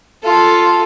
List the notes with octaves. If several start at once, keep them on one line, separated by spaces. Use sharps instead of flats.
F4 A4